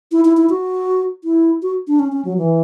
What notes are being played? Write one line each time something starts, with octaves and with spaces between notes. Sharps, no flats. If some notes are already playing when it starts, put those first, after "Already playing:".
E4
E4
E4
F#4
E4
F#4
D4
C#4
C#4
F#3
E3